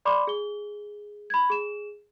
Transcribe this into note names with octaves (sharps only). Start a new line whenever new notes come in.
D5 B5 C6 D6
G#4 G7
B5 G#6
G#4 E7